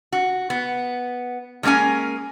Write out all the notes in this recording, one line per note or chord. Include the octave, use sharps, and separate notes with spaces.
F#4
B3
F3 G#3 A#3 C#4 G#5